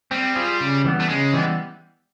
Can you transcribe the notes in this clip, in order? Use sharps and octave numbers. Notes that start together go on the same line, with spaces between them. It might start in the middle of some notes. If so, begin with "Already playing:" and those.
G3 C4
F4 G#4
C#3
E3 G3 B3
A3
C#3 G#3
E3 G3 B3